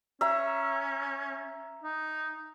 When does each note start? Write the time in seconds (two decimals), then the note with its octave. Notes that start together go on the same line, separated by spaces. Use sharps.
0.21 C#4 E5 A#5
1.83 D#4